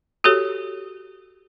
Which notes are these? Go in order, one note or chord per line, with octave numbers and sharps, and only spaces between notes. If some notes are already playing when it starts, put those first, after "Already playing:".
F#4 G4 A4 C#5